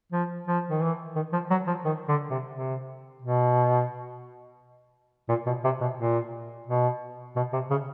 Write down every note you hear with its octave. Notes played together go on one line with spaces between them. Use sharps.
F3
F3
D#3
E3
D#3
F3
F#3
F3
D#3
D3
C3
C3
B2
A#2
B2
C3
B2
A#2
B2
B2
C3
C#3